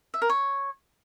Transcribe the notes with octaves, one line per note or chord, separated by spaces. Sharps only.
E5
A#4
C#5